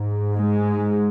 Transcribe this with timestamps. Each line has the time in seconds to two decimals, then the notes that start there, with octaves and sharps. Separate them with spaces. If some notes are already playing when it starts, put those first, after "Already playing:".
Already playing: G#2
0.32 G#3